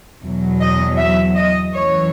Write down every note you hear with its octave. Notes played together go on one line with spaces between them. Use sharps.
E2 B2 F#3
D#5
E5
D#5
F#2 E3 C#5